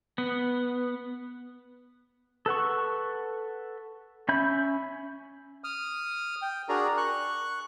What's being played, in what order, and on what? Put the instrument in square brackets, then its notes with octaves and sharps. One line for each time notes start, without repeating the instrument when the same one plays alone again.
[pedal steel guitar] B3
A4 B4 F#5 C#6
C#4 E5 B5 G6
[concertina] D#6 F6
G5
D4 F#4 G#4 A#4 D5 A#5
C#6 F#6